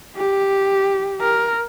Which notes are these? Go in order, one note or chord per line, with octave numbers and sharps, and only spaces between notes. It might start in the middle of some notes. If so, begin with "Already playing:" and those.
G4
A#4